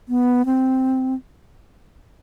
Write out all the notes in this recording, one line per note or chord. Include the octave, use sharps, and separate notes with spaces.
B3
C4